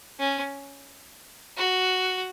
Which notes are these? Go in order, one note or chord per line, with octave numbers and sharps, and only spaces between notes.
C#4
F#4